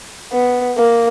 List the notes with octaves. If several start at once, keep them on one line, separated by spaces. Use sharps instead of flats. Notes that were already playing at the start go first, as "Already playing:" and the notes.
B3
A#3